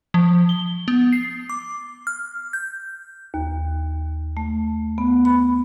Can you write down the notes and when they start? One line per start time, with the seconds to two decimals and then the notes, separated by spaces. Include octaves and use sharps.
0.14 F3
0.49 G7
0.88 B3
1.12 C7
1.49 D6
2.07 F6
2.53 G6
3.34 D#2
4.37 A3
4.98 B3
5.25 B5